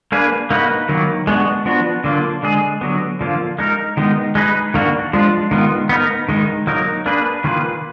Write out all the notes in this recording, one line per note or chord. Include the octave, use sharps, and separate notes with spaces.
A#3 D4 G#4 B4
A#3 D#4 F#4 B4
D#3 F#3 A#3
G#3 B3 D4 F#4
F3 B3 D4 F#4
D3 F#3 A#3 D4 F4
D3 G#3 D4 G#4
D3 F#3 B3
D3 F3 A#3 F4
G#3 D#4 A#4
D#3 G#3 B3 D#4
G#3 D#4 G#4 B4
D#3 A#3 D4 F#4
F3 G#3 D4 F4
D#3 G#3 B3 F4
B3 D#4 A#4
D#3 G#3 D#4
F#3 A#3 D#4 A#4
A#3 D4 G#4 B4
D#3 A#3 F4 G#4 B4